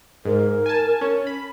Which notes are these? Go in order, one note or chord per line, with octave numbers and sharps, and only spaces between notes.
G#2 A#4
G#5 A5
C#4
B5